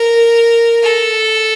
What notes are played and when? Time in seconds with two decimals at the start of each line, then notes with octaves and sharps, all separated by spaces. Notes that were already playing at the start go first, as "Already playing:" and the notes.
Already playing: A#4
0.83 A4